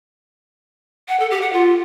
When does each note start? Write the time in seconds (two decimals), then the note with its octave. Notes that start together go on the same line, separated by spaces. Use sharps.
1.08 F#5
1.19 A4
1.30 G4
1.42 F#5
1.53 F4